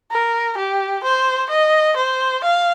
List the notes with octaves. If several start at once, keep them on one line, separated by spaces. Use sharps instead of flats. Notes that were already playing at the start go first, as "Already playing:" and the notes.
A#4
G4
C5
D#5
C5
F5